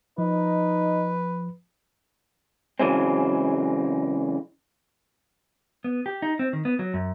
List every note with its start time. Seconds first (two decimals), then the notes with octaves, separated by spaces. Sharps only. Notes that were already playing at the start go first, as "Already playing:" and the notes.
0.18 F3 D#4 B4 D#5
2.79 C#3 E3 F#3 G#3 C4
5.84 B3
6.06 G4
6.22 D#4
6.39 C4
6.53 D#3
6.65 B3
6.79 F#3
6.94 F#2